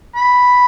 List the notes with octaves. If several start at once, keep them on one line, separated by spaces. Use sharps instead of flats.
B5